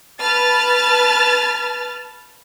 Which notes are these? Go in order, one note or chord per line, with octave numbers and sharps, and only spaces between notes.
B4 A5 F6 A6